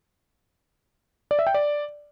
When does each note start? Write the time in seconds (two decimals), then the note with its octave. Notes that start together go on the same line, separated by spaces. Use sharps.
1.31 D5
1.39 E5
1.47 G5
1.54 D5